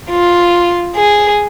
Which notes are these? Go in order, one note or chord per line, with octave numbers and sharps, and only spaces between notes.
F4
G#4